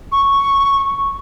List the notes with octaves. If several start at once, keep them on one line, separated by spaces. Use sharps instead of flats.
C#6